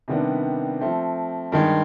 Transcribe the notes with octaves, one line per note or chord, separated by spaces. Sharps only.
C3 D#3 G3 B3 D4
F3 A3 C4
G2 D#3 G#3